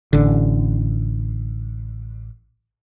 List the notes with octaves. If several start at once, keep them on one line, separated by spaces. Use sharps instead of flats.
A1 D3